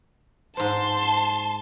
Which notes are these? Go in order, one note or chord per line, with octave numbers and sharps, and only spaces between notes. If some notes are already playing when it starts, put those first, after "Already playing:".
G#2 C5 A5 C6